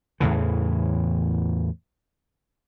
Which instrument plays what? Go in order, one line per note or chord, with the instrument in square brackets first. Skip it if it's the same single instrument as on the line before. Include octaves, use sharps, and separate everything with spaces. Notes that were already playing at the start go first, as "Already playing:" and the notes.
[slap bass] E2 A2 C#3 E3